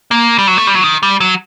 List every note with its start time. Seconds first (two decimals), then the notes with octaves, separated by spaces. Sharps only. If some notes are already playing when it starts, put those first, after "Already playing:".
0.11 A#3
0.38 G3
0.47 F#3
0.57 A3
0.67 G3
0.75 F#3
0.84 D#3
1.03 G3
1.20 F#3